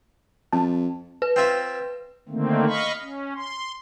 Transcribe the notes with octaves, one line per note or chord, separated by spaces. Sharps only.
F2 A5
B4
C4 F4 E5
D3 D#3 A3 A#3 C4
D#5 F5 B5 C#6
C#4
C6